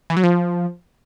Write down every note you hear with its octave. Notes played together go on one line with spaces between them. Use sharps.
E3
F#3
F3